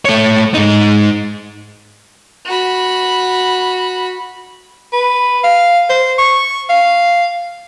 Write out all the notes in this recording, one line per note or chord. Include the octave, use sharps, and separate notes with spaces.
A3 C#5
G#2 D#4
F#4 B5
B4
F5
C5
C#6
F5